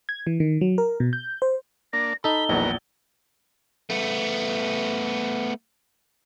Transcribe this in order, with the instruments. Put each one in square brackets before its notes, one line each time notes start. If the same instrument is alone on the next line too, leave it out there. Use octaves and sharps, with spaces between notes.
[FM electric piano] G#6
E3
D#3
F#3
A#4
B2
G6
C5
[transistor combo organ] A#3 D4 [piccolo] A#6
[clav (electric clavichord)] D#4 A4 [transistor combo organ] B5 [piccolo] G7
[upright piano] A#1 E2 [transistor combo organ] F#3 B3 A#4
[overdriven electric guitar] A3 B3